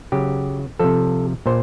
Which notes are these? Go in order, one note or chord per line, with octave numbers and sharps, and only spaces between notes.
C#3 F#3 G4
C3 F3 A4
A#2 C5